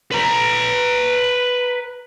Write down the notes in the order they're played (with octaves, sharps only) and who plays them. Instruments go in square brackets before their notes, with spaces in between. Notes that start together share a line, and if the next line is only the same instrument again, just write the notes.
[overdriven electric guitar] B4 A#5